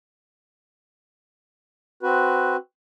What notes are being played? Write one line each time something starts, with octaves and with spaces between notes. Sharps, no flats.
C4 F#4 B4